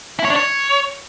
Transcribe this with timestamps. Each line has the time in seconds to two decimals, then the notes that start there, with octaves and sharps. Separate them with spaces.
0.19 E4
0.25 C#5
0.30 D4
0.36 C#5